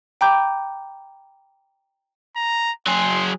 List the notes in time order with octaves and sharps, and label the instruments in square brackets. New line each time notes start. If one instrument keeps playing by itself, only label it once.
[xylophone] G5 A#5 B5 D6 G6
[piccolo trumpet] A#5
[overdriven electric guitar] F#3 G#4 [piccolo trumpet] C6